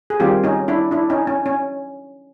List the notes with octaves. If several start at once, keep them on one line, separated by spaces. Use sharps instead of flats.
G#4
D#3 G3 C4 F4 G4
C#4 D#4
D4 E4
D4 E4
C#4 D#4
C#4
C#4